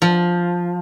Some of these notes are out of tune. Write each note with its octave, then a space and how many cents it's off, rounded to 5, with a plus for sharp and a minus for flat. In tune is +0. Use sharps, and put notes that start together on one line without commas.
F3 +5